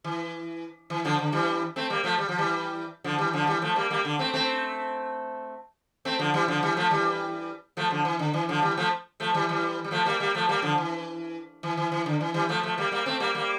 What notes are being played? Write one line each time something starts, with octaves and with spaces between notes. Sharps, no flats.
E3
E3
D3 F3
D3
E3 G3
A3 C4
G3 A#3
F3 A3
G3
F3
E3 G3
D3 F3
E3 G3
D3 F3
E3 G3
F3 A3
G3 A#3
G3 A#3
D3
A3 C4
A3 C4
A3 C4
D3 F3
E3 G3
D3 F3
E3 G3
F3 A3
E3 G3
F3 A3
D3 F3
E3
D3
E3
D3 F3
E3 G3
F3 A3
F3 A3
E3 G3
E3 G3
G3
F3 A3
G3 A#3
G3 A#3
F3 A3
G3 A#3
D3 F3
E3
E3
E3
E3
D3
E3
E3 G3
F3 A3
F3 A3
G3 A#3
G3 A#3
A3 C4
G3 A#3
G3 A#3